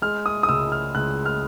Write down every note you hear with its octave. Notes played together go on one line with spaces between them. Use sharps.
G#3 F6
D#6
D#6
C#2 E6
F6
C#2 F#6
F6